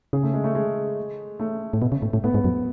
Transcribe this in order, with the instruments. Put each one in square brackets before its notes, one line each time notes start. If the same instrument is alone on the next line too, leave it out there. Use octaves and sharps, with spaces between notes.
[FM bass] C#3 [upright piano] G#4
[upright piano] A3
G#3
A3
G#3
A3
[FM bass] A2
B2
C#3
A2
A2
[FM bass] A2 [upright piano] B3
[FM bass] G#2
F#2